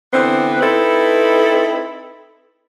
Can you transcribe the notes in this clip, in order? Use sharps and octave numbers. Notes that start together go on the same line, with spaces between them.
D3 E3 B3 C4
C4 D#4 E4 A4 B4